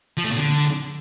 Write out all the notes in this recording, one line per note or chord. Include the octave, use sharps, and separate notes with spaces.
F3
A3
A#2
D3